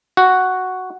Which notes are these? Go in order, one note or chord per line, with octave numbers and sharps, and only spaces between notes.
F#4